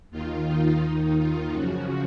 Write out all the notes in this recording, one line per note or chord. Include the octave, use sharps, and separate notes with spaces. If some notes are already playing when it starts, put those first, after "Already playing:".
D#2 D#3 F4
D#4
D#2 D#3 D#4
F4
F#2 C#3 F3 F#4